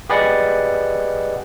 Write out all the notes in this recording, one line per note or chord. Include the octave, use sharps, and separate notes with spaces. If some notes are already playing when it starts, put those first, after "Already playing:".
G4 G#4 B4 D5 D#5 F#5